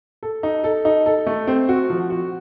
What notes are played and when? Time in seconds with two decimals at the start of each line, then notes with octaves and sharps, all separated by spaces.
0.23 A4
0.43 D#4
0.64 A4
0.85 D#4
1.06 A4
1.27 A3
1.47 C4
1.69 F#4
1.90 F3
2.10 F#4